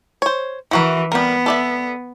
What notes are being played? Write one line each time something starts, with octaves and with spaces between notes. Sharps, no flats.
C5 C#5
E3 E4 F#4 A#4
G3 B3 A#4
A4 D5 E5